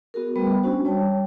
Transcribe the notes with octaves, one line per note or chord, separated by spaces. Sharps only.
B3 F#4 G#4 A#4
G3 A3 B3 B4 G5 B5
G#3 C#4 D4 F#4 C5
G3 C#5 G5 A5